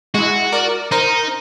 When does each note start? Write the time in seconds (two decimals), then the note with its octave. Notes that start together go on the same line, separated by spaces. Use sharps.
0.15 G#3 E4 F#4
0.52 A#4 D5
0.92 D#4 A#4 C5 A#6